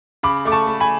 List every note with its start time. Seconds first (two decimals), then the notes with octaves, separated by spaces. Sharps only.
0.23 C#3 B5 D6
0.45 A3 D6
0.52 A5 C#6
0.67 A3
0.80 G#5 B5